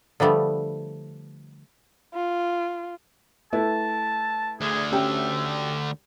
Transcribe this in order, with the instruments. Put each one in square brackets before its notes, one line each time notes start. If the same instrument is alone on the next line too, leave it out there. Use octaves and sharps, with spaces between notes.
[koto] D3 F3 G3 A3 B3
[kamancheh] F4
[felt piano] A3 E4 B4 [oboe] A5
[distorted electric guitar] D2 D3 [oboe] G#4
[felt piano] C#4 G4 G5 [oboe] E5